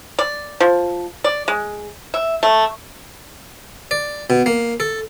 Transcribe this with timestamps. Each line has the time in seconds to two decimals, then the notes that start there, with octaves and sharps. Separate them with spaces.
0.19 D5
0.60 F3
1.24 D5
1.48 G#3
2.14 E5
2.43 A3
3.91 D5
4.30 B2
4.46 A#3
4.80 A4